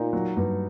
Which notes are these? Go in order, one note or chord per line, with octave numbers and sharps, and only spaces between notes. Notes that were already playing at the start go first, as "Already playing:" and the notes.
Already playing: A#2 D#4
F#3
G2